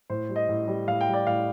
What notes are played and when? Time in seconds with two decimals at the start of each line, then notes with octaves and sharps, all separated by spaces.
0.10 A2 C5
0.29 G3
0.36 D#5
0.49 A2
0.68 G3
0.88 A2 F5
1.01 G5
1.07 G3
1.14 D5
1.27 A2 F5